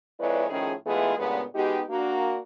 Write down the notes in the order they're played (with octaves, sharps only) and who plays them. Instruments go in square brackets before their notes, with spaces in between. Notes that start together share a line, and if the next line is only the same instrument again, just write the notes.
[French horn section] F2 G#3 E4 B4 C#5 D5
A2 D#3 F3 C#4 G#4
E3 G#3 A3 B3 F4 G#4
G2 A#2 C#3 G#3 B3
G#3 B3 D#4 F#4 G4
A#3 D4 F#4